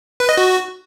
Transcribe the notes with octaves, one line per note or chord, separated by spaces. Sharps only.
B4
D#5
F#4